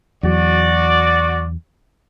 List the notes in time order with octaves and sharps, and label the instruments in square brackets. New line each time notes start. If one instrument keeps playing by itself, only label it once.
[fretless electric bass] E2 F#3 [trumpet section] F#4 D5